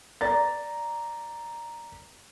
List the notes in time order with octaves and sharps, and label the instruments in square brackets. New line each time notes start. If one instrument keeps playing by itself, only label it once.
[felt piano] D5 A#5 A6